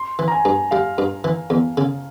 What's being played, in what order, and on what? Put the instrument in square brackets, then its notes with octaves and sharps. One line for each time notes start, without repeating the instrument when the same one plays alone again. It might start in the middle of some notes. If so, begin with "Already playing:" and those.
Already playing: [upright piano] C6
[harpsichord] E3
[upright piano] A#5
G#5
[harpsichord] G2
[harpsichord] G3 [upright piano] F5
[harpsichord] G2
E3
E2
C#3